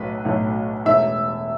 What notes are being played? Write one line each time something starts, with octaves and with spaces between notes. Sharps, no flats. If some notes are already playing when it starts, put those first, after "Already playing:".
Already playing: B1 A2 F#3 A3 B4
B1 A2 F#3 A3
E1 E2 E3 A3 E5